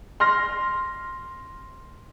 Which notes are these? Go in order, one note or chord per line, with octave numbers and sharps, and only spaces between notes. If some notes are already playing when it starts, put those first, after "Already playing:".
C6 F6 A#6